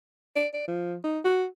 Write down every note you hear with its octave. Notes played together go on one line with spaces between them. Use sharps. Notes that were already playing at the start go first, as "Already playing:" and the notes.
D5
D5
F3
D#4
F#4